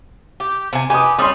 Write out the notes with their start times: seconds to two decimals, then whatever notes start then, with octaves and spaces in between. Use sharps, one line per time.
0.40 G4
0.73 C3 G#5
0.90 B3 G4 G#5 D#6
1.19 G3 C#4 C6 D#6